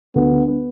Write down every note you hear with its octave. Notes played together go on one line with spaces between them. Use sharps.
D2 B3
D3
B3